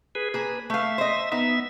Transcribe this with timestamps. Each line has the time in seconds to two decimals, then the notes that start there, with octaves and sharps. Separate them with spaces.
0.15 G#4 B4
0.34 A#3 G#4 B4
0.70 A3 E5 F5
0.98 C5 D#5
1.32 B3 D#4 E5